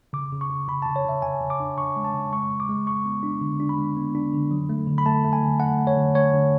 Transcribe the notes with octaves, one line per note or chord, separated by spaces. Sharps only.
C#3 D6
C#3
C#6
C#3
C#3 B5
C#3 A5
C#5
C#3 E5
C#3 G#5
C#3
D6
D4
C#3 C#6
G#3
A5
C#3
G#3 C#6
G#3
D6
G#3
G#3 C#6
B3
D4
D3
D4
B5
G#3
B3
D4
D3
F#3
A3
D3
B5
A3 A5
A3
G#5
D3
A3 F#5
A3
C#5
D3
A3 C#5
D3